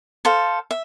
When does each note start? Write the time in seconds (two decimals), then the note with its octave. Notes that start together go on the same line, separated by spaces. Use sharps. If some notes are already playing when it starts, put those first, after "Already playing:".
0.25 A4 C5 F5
0.71 E5